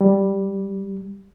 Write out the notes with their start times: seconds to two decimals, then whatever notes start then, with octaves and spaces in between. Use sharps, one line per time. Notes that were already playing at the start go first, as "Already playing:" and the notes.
0.01 G3